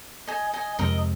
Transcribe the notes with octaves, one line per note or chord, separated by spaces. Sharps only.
D#5 G#5
D#5 G#5
F2 C3 G#3 C4 A#4 D#5